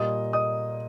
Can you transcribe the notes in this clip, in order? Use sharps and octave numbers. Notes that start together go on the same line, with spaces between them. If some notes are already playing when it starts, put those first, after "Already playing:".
Already playing: A#2 G3 A#3 D#5 D#6
D#5 D#6